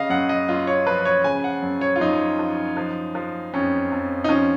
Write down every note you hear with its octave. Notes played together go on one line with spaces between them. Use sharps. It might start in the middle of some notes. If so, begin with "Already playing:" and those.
Already playing: C#3 D#5 F5
F#2 F#5
D#5
F#2 F4
C#5
F3 B4
C#5
C#3 G#5
F#5
F#2
C#5
F4
F#2 D#4
F3
F3
F3
F2 C#4
F2
D#4
F3 C#4